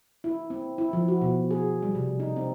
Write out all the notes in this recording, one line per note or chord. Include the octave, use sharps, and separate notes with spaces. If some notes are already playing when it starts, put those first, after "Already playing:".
E4
C4
E4
F3
F#4
B2
G#4
G3
C3
D#4
C4